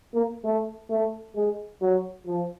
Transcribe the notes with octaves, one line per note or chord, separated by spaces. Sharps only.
A#3
A3
A3
G#3
F#3
F3